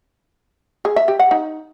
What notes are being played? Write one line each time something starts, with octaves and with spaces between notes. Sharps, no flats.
G#4
E5
G4
F#5
D#4